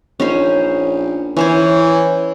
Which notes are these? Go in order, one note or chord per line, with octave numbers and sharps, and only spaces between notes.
A#1 C#4 D#4 C5
E3 C#4 C5 C#5